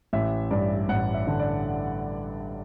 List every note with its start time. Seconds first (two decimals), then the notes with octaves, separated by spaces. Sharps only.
0.13 A1 E5
0.51 G2 D5
0.89 A1 F#5
1.14 E5
1.27 D3
1.39 D5